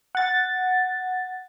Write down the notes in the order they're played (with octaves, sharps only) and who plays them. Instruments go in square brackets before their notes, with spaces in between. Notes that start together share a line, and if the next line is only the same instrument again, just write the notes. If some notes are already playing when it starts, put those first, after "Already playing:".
[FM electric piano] F#5 A6